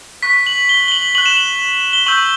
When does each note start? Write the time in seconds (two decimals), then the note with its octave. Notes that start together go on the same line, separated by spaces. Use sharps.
0.23 C#6 F#6 B6
0.47 F#7
0.69 G7
0.88 G7
0.92 F#7
1.15 C#6 F#6 F#7
1.26 E7
1.37 F#7
1.93 G7
2.07 C#6 E6 G6 F#7